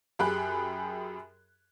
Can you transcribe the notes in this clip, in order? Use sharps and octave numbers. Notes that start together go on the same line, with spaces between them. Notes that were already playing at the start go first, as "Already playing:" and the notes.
F#2 G4 G#4 G5 B5 F#6